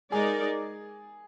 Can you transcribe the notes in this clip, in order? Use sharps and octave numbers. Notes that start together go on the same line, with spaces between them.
G#3 D#4 G#4 A#4 D5